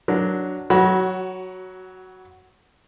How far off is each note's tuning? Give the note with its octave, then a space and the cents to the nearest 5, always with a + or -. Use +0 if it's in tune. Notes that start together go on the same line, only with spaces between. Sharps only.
F#3 +0 D4 +0 A#4 +25
F#3 +0 F#4 +25 B5 -30